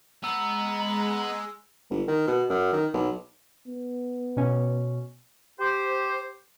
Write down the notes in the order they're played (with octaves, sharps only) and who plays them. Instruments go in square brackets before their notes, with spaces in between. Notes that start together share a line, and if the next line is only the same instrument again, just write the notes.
[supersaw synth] G#3 [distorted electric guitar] B3 [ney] A#5 [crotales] E6
[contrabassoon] G1
D#3
B2
F#2
D#3
B1
[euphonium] B3
[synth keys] B2 C#4
[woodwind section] G4 C5